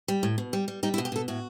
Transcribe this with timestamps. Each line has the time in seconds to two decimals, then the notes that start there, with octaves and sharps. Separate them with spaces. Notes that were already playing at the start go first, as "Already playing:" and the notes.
0.08 G3
0.23 A2
0.38 B2
0.53 G3
0.68 G3
0.83 G3 D#4
0.94 E4
0.98 B2
1.05 G4
1.12 B2 A4
1.28 A2 F#4